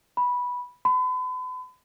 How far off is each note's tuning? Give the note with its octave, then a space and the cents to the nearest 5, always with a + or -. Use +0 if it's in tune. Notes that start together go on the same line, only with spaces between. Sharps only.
B5 -10
B5 +40